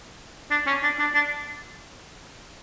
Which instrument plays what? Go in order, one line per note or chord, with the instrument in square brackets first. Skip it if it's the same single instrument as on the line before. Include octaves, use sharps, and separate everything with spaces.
[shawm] D4
C#4
D4
D4
D4